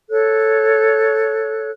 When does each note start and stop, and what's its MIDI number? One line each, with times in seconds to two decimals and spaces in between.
0.10 1.71 69
0.10 1.71 73
0.10 1.71 90